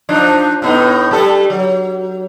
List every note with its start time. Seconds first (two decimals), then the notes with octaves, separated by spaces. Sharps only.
0.09 F3 D4 D#4
0.62 A2 B3 D#4
1.11 G3 A3 A4
1.50 F#3